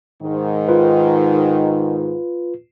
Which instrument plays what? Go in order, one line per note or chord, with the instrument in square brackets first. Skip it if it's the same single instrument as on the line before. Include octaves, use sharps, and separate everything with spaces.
[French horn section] G#2 D#3
[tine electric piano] F4 B4